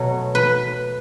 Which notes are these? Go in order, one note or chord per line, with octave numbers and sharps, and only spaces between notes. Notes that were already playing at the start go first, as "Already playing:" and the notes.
Already playing: B2 F#3 A3
B4